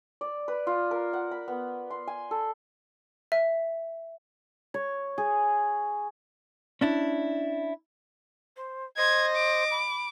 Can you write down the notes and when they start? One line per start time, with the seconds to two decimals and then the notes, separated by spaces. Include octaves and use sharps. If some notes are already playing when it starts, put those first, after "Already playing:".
0.21 D5
0.48 B4
0.67 F4
0.91 A#4
1.13 F#5
1.31 B5
1.48 B3
1.90 C6
2.07 G#5
2.31 A4
3.32 E5
4.74 C#5
5.18 G#4
6.81 C#4 D4 E4
8.57 C5
8.98 C5 D#5 G#6
9.36 D6
9.71 B5